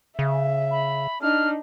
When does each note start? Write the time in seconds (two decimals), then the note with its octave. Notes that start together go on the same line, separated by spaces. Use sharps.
0.19 C#3 E5
0.71 B5
1.22 D4 D#4 F6